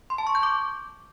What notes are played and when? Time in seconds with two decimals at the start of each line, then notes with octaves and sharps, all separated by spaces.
0.10 C6
0.18 A5
0.27 C#6
0.35 G6
0.43 D6